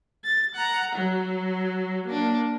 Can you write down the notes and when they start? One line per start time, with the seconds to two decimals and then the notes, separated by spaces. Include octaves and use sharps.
0.24 A6
0.55 F#5 A#5
0.95 F#3
2.06 A#3 D4